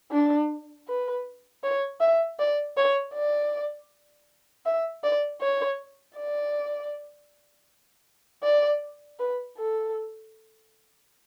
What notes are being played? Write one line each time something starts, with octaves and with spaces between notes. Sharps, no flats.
D4
B4
C#5
E5
D5
C#5
D5
E5
D5
C#5
D5
D5
B4
A4